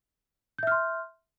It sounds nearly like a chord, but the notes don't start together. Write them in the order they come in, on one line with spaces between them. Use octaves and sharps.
G6 E5 F6 C6